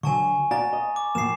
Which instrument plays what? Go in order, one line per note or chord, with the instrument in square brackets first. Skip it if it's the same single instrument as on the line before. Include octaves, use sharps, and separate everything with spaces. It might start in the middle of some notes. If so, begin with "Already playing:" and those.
[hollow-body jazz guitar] D3 F#3 [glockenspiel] G#5 A5 C#6
[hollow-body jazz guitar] F#4 D5 F5 [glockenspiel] A5 A#5 A6
[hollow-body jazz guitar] D#5
[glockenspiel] D6
[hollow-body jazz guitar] A2 F3 A#3 [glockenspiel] C7 E7